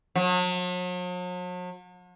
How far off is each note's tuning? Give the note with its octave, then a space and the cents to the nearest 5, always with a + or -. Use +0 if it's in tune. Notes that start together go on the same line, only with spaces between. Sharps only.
F#3 -45